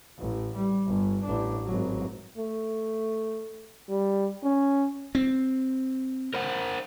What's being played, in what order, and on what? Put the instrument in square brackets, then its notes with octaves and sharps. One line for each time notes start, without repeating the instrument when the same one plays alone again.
[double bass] A1
G3
G1
A1 D4
G#1 F#3
[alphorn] A3
G3
C#4
[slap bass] C4
[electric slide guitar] A#4 C5 F#5